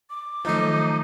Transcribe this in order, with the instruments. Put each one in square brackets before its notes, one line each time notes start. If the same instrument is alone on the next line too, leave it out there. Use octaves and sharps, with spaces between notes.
[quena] D6
[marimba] D#3 F#3 [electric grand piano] F3 A3 [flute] D#4